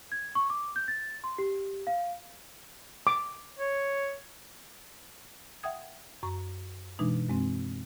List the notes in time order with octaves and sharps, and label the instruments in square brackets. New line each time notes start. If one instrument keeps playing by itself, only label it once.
[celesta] G#6
C#6
D6
G6
A6
C6
G4
F5
[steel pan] D6
[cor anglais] C#5
[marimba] E5 F#5 G5 D#6 G#6
F#2 A#5 C#6
B2 E3 G#3 D4 D#4
F#2 G#3 C4